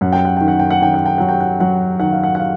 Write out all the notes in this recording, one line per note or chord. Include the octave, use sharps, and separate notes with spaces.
F#2 F#5
G5
F#5
D#3 G5
F#5
G5
F#5
D#3 G5
F#5
G5
F#3 F#5
G5
F#5
F#3 F#5
D#3 F#5
F5
F#5
F#5
F5